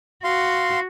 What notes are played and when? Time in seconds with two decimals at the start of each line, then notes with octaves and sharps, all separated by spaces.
0.24 F#4 F5 C6